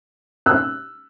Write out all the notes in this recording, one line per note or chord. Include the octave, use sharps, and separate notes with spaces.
E6 F#6